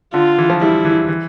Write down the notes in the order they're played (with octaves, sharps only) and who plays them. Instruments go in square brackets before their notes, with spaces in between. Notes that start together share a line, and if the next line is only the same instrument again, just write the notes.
[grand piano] D3 [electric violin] F4
[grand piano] E3
F3
[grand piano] G3 [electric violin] E4
[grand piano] E3
E3